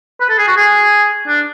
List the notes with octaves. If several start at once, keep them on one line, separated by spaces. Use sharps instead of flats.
B4
A4
G#4
F#4
G#4
D4